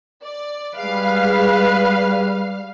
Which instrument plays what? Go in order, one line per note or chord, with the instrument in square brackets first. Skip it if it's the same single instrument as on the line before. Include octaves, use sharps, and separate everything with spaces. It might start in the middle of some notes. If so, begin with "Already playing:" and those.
[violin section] D5
[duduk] G3 [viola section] G#3 G#4 [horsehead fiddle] B4 [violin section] F5